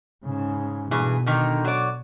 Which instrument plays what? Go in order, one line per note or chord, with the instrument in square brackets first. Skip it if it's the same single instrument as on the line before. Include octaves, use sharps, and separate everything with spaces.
[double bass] G#2 C#3
[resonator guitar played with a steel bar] G2 E3 G#4 [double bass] B2
[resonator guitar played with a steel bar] D3 D#3 D#4
F#3 D5